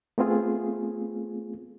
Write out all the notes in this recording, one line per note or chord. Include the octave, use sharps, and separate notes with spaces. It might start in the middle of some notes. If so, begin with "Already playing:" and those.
A3 B3 C4 F4 G#4